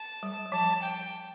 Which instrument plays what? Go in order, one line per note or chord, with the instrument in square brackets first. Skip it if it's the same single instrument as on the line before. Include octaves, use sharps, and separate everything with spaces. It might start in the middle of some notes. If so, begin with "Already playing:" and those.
Already playing: [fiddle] A5
[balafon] G3
G3
[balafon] F3 [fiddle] A5
[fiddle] G5